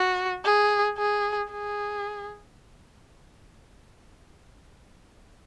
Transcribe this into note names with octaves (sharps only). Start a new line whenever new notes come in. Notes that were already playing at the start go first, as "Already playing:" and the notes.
Already playing: F#4
G#4
G#4
G#4